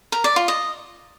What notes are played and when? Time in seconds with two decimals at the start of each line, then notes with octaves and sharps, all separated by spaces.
0.12 A#4
0.24 D5
0.36 F4
0.48 D#5